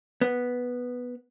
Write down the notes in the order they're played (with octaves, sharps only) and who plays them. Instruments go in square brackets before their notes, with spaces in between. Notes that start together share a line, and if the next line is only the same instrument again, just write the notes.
[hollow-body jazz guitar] B3